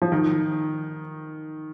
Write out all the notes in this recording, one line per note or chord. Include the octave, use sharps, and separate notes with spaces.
F3
D#3